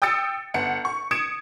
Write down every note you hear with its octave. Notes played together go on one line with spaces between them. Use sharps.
G5 D#6 E6 A6 C#7
G1 F#5 C#7
C#6
D#6 G#6 C#7 D7 E7